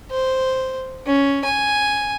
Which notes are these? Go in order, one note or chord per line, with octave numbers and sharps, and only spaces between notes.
C5
C#4
G#5